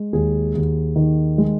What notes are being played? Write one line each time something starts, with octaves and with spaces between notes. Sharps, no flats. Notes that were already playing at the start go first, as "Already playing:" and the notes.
Already playing: G#3
D#2 G#4
D#2
D#3
G#3